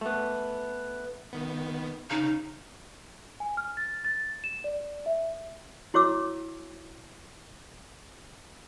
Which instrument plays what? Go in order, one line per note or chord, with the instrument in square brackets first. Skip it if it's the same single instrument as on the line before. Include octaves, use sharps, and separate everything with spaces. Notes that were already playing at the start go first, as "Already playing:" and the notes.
[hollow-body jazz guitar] A3 B3
[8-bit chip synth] D#3 B3
[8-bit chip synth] C#3 F5 [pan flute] D#4
[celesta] G#5
F6
A6
A6
E7
D5
E5
[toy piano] E4 F#4 C#5 D6 E6